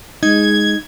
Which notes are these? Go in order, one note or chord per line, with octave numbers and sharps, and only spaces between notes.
G#3 D#4 G#6